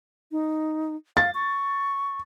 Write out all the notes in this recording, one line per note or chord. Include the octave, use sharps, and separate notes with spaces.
D#4
F5 A6
C#6